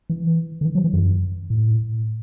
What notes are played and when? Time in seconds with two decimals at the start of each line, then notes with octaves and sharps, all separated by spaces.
0.10 E3
0.61 D3
0.65 E3
0.75 F#3
0.84 E3
0.93 F#2
1.50 A2